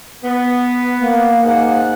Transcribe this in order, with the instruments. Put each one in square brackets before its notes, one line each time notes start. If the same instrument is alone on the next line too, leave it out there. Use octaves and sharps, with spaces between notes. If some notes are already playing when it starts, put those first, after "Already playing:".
[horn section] B3
[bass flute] A#3
[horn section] G#2 G#4 F#5